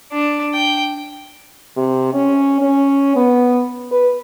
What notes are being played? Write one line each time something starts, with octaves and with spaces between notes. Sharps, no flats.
D4
G5
C3
C#4
C#4
B3
B4